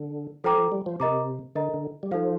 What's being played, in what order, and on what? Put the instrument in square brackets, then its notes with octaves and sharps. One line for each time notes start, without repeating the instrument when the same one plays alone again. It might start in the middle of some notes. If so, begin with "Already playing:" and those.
Already playing: [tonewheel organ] D3
[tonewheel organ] F3 [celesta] A4 C5 G5 A#5 D6
[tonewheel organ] F3
G3
F3
[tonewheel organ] C3 [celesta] A#4 D#5 A#5 D6
[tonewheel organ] D3 [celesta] A#4 D#5 A#5
[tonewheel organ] D3
G3
[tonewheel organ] F3 [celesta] D#4 A4 C5 F5